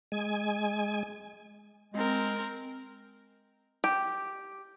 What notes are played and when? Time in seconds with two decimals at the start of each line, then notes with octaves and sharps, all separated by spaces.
0.12 G#3 G#5
1.94 G#3 C4 A#4
3.84 G4